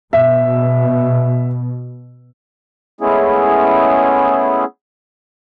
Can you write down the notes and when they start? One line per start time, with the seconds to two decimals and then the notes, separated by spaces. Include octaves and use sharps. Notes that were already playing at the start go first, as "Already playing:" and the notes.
0.13 B2 E5
3.01 G#3 A3 B3 C#4 E4 G#4